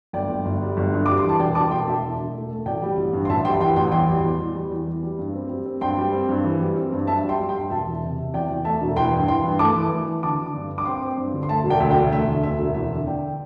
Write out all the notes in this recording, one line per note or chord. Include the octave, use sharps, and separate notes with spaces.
G1 D5 G5
G1
G1
G3
G1
G2
G3 D6
C6
E3
A5
E1 D5 G5
E1 A5 D6
E1 G5 C6
E1 E5 A5
E2
E1
A3
A3
A1 D5 G5
G3
A1
G2
C6
A1 E5 A5
G3 G5 C6
E3 G5 C6
A1 G5 C6
E2 G5 C6
G3
E2
E2
G3
E2
E3
G3
G2
C4
G3
C4
G2 G5 C6
G3
C4
G2
E3
G3
C4
G2
G2 E5 A5
G3
G5 C6
G3
G5 C6
G2
E1 E5 A5
E2
C3
C3
E2 D5 G5
E2
A3 E5 A5
E1
E3 G5 C6
G2
E3 G5 C6
G2
A3 A5 D6
E3
E3
E3
D3 A5 D6
D3
G2
G2
D6
C4 G5 C6
C4
G2
D3
C6
A3 E5 A5
E1
D5 G5
D2 E5
D5 G5
E1
A3 E5
D3
D2 E5
E1
E2 E5
D3
D3 D5 G5